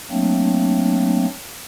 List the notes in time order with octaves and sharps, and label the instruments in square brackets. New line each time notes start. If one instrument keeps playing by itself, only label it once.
[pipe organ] F#3 A3 A#3 C4 D4